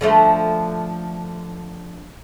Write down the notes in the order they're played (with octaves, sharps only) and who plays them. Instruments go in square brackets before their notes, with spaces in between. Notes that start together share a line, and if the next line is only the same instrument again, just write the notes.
[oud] D3 F3 A3